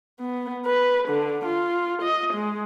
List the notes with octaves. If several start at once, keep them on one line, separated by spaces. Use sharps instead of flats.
B3
B4
D3
F4
D#5
G#3